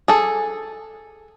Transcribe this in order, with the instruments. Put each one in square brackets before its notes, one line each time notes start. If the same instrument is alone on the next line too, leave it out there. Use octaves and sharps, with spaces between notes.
[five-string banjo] G#4 A4